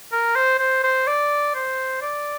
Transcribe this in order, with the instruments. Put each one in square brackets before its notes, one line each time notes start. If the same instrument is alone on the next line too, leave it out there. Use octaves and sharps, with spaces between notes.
[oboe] A#4
C5
C5
C5
D5
C5
D5